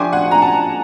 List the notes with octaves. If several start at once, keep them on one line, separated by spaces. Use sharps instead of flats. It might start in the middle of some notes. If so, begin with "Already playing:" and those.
Already playing: F3 A3 D4 G4 C5 G#5
F#5
A#5
A5